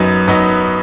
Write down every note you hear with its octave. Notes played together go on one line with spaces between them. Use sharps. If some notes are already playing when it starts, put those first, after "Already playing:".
Already playing: F#2 F#3 B3 D#4
F#2 F#3 B3 D#4